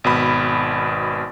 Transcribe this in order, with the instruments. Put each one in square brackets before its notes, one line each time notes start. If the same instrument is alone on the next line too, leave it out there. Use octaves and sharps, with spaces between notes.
[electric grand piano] G#1 B2 B5